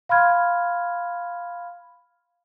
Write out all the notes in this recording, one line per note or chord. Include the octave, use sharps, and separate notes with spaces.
F5 B5 C6 F6 G#6